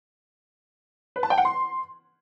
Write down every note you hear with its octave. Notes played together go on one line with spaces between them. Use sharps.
B4
A5
G5
F#5
C6